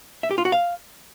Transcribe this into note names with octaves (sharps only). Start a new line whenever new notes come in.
E5
G4
F4
F#4
F5